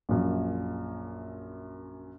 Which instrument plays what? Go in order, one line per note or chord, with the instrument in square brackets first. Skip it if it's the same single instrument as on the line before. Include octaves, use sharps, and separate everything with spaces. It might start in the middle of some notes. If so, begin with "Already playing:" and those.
[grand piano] A#1 F#2